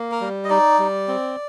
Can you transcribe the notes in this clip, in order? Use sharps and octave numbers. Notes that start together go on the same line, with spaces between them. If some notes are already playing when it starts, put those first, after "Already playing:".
Already playing: A#3
A#4
G3
D#5
D#4 D5
G3
C4